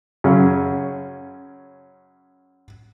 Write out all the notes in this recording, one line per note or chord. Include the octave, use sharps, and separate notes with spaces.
F#2 C#3 C#4